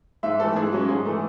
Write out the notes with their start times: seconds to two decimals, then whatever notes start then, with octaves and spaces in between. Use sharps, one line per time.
0.23 G#2 E5
0.39 E3 A3 A4
0.56 G#2 G#4
0.72 F#3 C#4
0.88 G#2 G#4
1.05 E3 A3